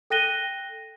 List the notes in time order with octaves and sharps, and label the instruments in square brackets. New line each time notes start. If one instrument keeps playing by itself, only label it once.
[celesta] A4 G5 F#6 A#6 D#7 G7